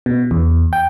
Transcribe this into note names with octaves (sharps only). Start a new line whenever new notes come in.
B2
E2
G5